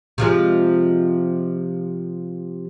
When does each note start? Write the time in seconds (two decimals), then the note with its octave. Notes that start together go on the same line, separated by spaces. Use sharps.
0.18 C3 F3 G#3